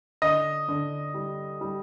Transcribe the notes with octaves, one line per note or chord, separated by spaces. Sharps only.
D3 D#5
D3
G3
G3